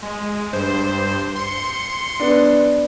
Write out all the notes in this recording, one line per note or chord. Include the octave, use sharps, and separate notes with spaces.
G#3
G2 C5
C6 C#7
B3 D4